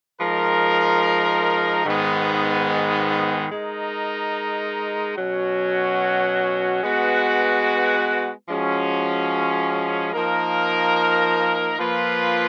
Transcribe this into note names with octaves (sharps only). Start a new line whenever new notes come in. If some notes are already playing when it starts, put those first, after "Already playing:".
F3 G#3 D#4 A#4
G#2 D#3 G#3 B3
G#3 D#4 A#4
B2 F#3 C#4 F#4
G#3 B3 F#4 B4
F3 G#3 C#4 F#4
F3 A#3 D#4 A#4
F3 A#3 F4 B4